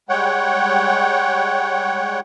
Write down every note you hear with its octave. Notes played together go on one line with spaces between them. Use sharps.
G3 G#3 C#5 F#5 G5